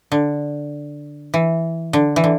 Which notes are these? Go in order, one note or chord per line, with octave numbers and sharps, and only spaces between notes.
D3
E3
D3
E3
D3